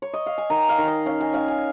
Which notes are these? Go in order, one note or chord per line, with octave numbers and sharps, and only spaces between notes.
C#5
D#5
F5
G#5
D#3 A#5
F5
D#3
D#5
C#4 F5
G#5
C#4 F5
G#5